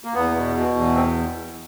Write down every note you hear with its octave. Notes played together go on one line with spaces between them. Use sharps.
A#3
E2 B3
B2
B2
E2
C4